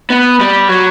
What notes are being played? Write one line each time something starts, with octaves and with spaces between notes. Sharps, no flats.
B3
G3
F#3